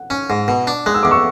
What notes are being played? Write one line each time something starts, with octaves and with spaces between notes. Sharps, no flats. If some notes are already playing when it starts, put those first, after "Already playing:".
Already playing: F#5
C#4 G#5
G#2
B2
D4
G#3 F#6
E6
E2 D6
C#6 E6